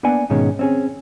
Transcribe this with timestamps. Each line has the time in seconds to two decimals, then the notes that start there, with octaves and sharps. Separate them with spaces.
0.03 A#3 B3 D4 D5 F#5 G#5
0.30 G#2 B2 D#3 G#3 C#4
0.59 C4 C#4 G#4